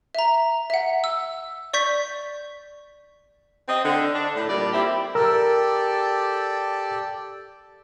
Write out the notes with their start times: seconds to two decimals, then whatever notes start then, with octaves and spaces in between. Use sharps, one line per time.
0.15 E5 A#5
0.70 E5 F#5
1.04 E6
1.73 D5 C#6 G6 B6
3.68 C4 D#5
3.84 D3
4.14 D4
4.35 A2
4.49 A#2 G3 D5
4.73 C4 E4 G4
5.15 G4 A4 A#4 D5 E6